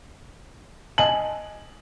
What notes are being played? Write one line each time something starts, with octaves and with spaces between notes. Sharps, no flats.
D#5 G#5 A5 F#7